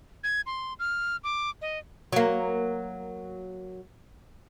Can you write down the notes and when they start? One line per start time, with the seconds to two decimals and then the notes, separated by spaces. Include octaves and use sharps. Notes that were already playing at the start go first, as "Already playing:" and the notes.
0.24 G#6
0.46 C6
0.79 F6
1.24 D6
1.61 D#5
2.12 F#3 A#3